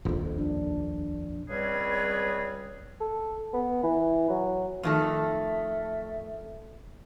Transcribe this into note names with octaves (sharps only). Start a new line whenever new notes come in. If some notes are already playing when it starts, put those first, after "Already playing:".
D#1 A#1 F2
D4
C#2 G3 C4 G#4 B4 C#5
A4
B3
E3
F#3
F2 D#3 A3 A4